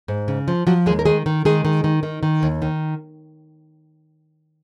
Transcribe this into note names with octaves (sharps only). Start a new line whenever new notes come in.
G#2
C#3
F3
F3 F#3 F#4
D#2 G#3 G#4
A#4
D#3 G#3 G#4
D#3
D#3 G#3 G#4
D#3
D#3
D#3
D#3
D#2
D#3